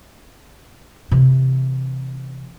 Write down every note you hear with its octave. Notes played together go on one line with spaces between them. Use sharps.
C3 E3